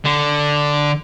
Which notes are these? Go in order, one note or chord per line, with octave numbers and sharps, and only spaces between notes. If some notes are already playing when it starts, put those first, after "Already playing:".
D3